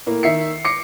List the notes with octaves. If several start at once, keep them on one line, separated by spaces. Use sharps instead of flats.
A2 A#3
D#3 E5 C7 C#7
D6 A#6 C7 C#7